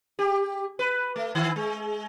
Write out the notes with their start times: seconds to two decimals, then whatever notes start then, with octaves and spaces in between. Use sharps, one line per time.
0.19 G4
0.79 B4
1.16 A3
1.35 D#3
1.56 G#3